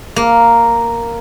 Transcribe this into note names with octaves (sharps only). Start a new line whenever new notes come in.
A#3